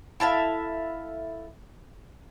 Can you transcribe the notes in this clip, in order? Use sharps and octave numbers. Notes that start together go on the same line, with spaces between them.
E4 A4 E5 F5